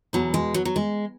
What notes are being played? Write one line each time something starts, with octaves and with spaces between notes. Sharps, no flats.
E2 B2 F#3
G#3
F#3
F#3
G#3